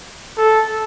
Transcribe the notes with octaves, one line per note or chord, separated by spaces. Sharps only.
A4